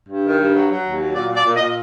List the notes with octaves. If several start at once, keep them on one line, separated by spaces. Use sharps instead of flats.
G2
D#3
G2
F#3
F#3
D#2
F#3
A#2 D5
A#2 D5
A#2
D#5
A#2